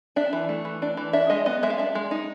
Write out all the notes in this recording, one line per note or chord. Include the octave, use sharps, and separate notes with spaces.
D4 E5
E3
A3
E3
D4
E3
D4 E5
G#3 D#5
B3 D#5
G#3 E5
F5
D4 E5
G#3
D#4